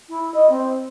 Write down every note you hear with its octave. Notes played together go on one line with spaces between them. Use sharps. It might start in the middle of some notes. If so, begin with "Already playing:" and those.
E4
D#5
C4